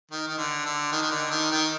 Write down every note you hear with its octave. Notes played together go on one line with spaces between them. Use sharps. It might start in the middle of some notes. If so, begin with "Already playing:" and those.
D#3
D#3
D3
D3
D#3
D#3
D3
D#3
D#3